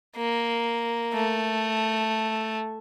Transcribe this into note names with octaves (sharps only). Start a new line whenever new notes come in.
A#3
A3